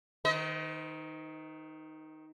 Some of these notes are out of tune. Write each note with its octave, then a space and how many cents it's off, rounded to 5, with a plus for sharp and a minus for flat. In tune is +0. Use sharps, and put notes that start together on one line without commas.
D#3 +0 C5 -45 D#5 +30